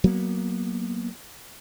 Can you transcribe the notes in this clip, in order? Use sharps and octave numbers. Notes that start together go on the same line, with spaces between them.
F#3 A#3 B3